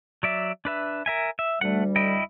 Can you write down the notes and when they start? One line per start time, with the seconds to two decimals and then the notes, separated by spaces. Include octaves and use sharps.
0.23 F#3 D5 E5
0.65 D4 B4 E5
1.06 A#4 E5 G#5
1.39 E5
1.61 D2 G3 A3 F#5
1.96 E4 D#5 G5